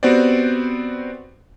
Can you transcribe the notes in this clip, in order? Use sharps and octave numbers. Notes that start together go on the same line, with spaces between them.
B3 C4 F#4 G4 C5 D5